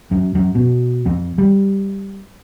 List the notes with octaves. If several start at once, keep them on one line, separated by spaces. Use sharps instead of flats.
F#2
F#2
B2
F2
G3